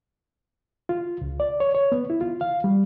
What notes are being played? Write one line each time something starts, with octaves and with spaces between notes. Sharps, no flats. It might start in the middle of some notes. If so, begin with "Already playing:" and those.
F4
C#2
D5
C#5
C#5
B3
E4
F4
F5
G3